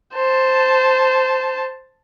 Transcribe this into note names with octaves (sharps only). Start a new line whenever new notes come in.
C5 A5